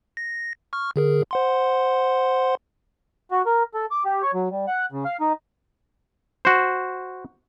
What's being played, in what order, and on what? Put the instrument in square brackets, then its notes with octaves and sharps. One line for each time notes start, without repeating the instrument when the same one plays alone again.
[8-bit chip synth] A#6
C#6 F6
D3 G#4 A#4
C5 F#5 C6
[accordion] F#4
A#4
A4
D6
G4
C#5
F#3
G3
F#5
C#3
F5
D#4
[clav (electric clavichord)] F#4 C5